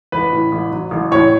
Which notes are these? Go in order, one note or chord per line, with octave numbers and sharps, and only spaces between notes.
A1 B4
A2
A1
F#3
A1
A2 C#5